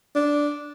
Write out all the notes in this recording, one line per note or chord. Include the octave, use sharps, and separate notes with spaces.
D4